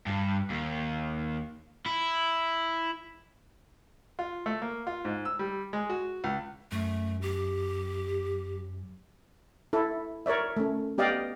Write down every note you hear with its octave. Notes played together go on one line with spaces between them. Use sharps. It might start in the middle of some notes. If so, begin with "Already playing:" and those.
G2
D#2
E4
F4
A3
A#3
F4
G#2
E6
G3
G#3
F#4
C#2
F#2 A3
G4
E4 A4
A#4 C#5 D5 E5
A3 C#4
B3 G4 D5 D#5 F5 G5